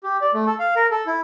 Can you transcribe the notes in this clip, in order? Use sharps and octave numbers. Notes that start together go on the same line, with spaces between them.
G4
D5
A3
A4
F5
A#4
A4
E4